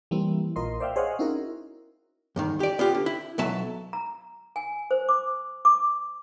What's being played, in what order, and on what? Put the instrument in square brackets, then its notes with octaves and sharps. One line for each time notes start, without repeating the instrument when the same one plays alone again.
[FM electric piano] E3 G3 A#3 C4 E4
A#1 F4 A#4 D#5 C6
C5 D5 E5 F5 G5
G#4 C5 C#5 D#5 F5 F#5
C4 C#4 D#4 E4 F#4 A#4
[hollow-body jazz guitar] E2 G2 D#3
G4 D5
B3 F4 G4
D3
E4
B1 B2 F#3 E5 A5
[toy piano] A#5
G#5
C5
D6
D6